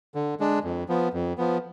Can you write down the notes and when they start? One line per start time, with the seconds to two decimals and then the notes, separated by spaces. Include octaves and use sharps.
0.15 D3
0.40 G#3 D4
0.64 F2
0.89 F3 B3
1.14 F2
1.38 F3 B3